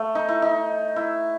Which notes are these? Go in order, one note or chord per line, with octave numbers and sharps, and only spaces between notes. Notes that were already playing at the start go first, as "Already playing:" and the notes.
Already playing: A3
D#4
E4
D#4
E4